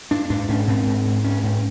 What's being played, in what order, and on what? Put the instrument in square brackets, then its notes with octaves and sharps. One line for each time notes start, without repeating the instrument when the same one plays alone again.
[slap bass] G#2 D4
G#2 D4
G#2 C#4
G#2 C4
G#2
G#2
G#2 C#4
G#2 C#4